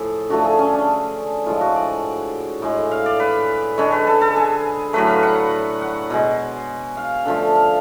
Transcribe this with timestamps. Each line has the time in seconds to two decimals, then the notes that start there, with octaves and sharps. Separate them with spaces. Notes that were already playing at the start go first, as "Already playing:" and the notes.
Already playing: A2 F3 G#4
0.30 D3 F3 A3 F#4
0.44 G#4
0.59 C#4
0.74 D4
1.46 A2 F3 G#3 F4
1.61 F#4
1.75 D5
2.62 A2 G#3
2.91 F5
3.06 D5
3.20 B4
3.77 D3 G#3 C#5
3.92 B4
4.07 A4
4.21 A4
4.36 G#4
4.93 A2 F#3 A3 B4
5.08 F5
5.23 F#5
5.81 F#5
6.10 B2 G#3
6.97 F5
7.25 D3 F3 A3
7.55 F5